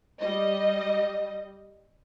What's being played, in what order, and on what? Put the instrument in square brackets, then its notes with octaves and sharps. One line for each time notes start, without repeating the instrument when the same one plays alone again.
[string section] G3 D#5